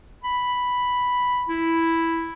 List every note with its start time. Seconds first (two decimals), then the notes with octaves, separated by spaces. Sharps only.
0.24 B5
1.49 E4